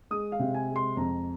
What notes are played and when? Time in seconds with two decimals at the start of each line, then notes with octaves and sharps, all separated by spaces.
0.11 G#3 D#6
0.32 F5
0.39 C3
0.54 G#5
0.69 G#3
0.76 C6
0.97 F2 A#5